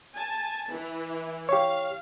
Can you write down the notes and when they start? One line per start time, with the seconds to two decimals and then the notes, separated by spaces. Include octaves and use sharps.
0.16 G#5 A5
0.71 E3
1.49 G4 C#5 F5